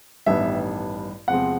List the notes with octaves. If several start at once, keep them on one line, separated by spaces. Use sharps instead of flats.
A1 G2 D#3 G3 B3 E5
E2 C3 F3 G#3 C4 F#5